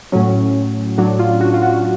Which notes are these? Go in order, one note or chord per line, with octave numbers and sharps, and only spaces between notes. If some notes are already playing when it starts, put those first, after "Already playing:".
A2 F#3 C#4
A2 F#3 D4
F4
F#4
F4
F#4